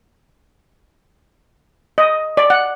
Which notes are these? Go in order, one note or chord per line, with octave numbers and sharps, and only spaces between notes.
D#5
D5
F#5